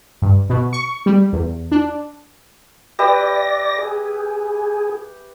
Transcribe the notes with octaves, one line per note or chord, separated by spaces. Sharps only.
G2
B2
C#6
G3
E2
D4
G4 B4 D5 E5 A#6
G#4